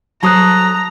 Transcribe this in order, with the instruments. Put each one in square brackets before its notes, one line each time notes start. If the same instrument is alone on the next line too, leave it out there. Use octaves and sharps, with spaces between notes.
[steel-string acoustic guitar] F#3 A4 C5 [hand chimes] A5 D#6 F#6 [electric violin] A#5